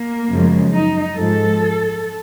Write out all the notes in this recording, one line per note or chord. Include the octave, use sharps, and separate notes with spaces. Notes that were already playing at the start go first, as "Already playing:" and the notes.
Already playing: A#3
F#2 C#3 F3 G#3
D#4
G#2 F3 G#3 A4